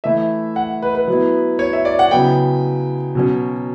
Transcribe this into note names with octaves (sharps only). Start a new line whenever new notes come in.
E3 A3 E4 E5
F#5
B4
B4
F#3 B3 E4
C#5
E5
D5
F#5
C#3 F#3 B3 E4 G5
B2 F#3 C#4